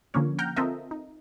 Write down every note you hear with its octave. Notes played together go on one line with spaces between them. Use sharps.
D3 F3 A#3 C#4 C#5
F#5 G5 A#5 F6 G6
C4 F4 A4 A#4 D#5 E5
D#4